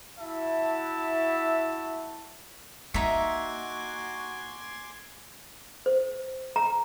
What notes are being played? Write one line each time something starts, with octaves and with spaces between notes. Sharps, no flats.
E4 F#4 E5 A5
A#3 D#4 F#4 E5 G#5 C6 D6
C5
A#5